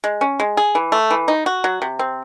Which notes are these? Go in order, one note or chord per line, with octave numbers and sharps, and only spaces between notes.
G#3
C#4
G#3
G#4
E3
A3
E3
D#4
F#4
F#3
C3
C4